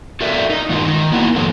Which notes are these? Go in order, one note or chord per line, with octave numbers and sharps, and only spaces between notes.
F#4 A4 A#4 D5 E5
D#4
G2 D#3 G#3 F4
D#3
A#3 B3 E4 F#4
F#2 A2 F3 F#3 A4